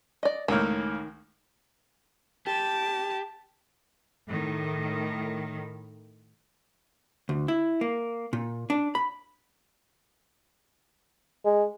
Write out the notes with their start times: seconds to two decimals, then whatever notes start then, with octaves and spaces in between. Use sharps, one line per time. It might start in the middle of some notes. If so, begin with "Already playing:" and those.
0.23 D5 D#5
0.48 C#2 A2 D#3 A#3
2.47 G4 A5
4.27 A2 D#3
7.29 D2
7.48 E4
7.81 A#3
8.33 A#2
8.70 D4
8.95 B5
11.45 G#3